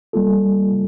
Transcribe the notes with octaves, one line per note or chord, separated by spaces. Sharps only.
G3 A#3 F4 A4